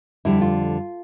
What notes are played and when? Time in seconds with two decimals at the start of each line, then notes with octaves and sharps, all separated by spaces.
0.25 F2 D3 G3 E4
0.42 F4